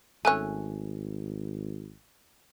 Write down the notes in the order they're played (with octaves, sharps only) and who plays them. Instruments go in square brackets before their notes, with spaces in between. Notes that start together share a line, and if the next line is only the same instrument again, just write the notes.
[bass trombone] G#1 [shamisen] A3 C#4 [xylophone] G#5 F#6